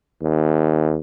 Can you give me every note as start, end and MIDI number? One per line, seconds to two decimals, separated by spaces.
0.22 1.00 39